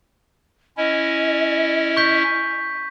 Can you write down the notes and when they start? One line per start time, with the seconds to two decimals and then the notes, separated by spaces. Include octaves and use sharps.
0.77 C#4 E4 D#5
1.97 C#6 G6 B6